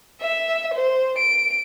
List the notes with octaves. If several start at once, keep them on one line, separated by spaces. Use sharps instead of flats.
E5
C5
D7